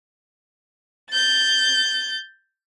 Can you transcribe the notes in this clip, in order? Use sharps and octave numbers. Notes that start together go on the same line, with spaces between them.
G6 A6